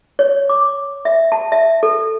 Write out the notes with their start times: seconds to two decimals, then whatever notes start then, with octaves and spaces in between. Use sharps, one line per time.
0.19 C#5
0.49 D6
1.05 E5
1.32 A5
1.52 E5
1.83 A4